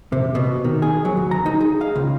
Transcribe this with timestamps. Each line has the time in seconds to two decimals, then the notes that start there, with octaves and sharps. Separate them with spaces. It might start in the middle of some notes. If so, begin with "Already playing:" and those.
0.12 C3
0.35 B2
0.64 D#3
0.82 G#4
1.05 F#3
1.17 D2
1.31 A#5
1.46 D#4
1.60 G#4
1.81 F5
1.96 C#2